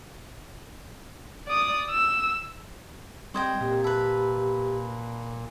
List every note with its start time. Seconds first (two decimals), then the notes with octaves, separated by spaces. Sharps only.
1.47 D5 D#6
1.91 E6
3.34 G3 C4 C5 D#5 G5 D#6 G#6
3.61 A#2 G4
3.84 B4 E5 A5 B5